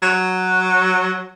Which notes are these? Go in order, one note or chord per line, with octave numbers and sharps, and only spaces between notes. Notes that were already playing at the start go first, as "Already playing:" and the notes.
F#3